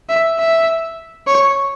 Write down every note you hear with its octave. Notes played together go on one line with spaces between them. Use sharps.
E5
E5
C#5